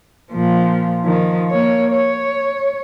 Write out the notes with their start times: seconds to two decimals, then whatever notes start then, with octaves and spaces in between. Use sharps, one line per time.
0.32 A#2 F3
1.04 D#3 F3
1.50 A#3 C#5
1.92 C#5